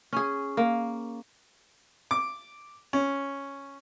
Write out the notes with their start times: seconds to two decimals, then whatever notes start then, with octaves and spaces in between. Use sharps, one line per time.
0.13 C#4 G#4
0.57 A#3
2.11 D6
2.93 C#4